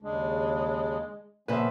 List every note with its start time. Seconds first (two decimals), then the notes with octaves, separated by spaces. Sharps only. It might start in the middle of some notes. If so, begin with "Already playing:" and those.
0.02 D#2 C#3 G#3 D4
1.48 A#2 C#3 F3 B3 C#4 B4 C5 E5